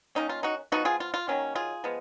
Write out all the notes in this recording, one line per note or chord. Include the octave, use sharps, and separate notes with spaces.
D#3 A#3 C#4 D#4
F4
D#4 F#4
F3 B3 D#4 F#4
F4 G#4
F4
F4
D#3 F#3 A#3 C#4
F4 G#4
F3 G#3 B3